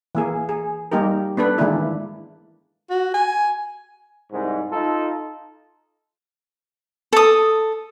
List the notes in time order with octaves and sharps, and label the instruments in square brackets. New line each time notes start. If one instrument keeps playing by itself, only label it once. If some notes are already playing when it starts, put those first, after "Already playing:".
[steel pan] E3 A#3 G#4
G#4
G3 A#3 D#4 G4 A#4
B3 D4 A4 B4
D#3 E3 G#3 A#3 D4 E4
[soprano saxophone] F#4
G#5
[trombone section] C2 G#2
D#4 F4 A4
[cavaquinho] A4 D#6